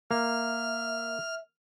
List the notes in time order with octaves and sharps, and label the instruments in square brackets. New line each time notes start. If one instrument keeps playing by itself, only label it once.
[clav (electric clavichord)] A#3 [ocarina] E5 [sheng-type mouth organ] F6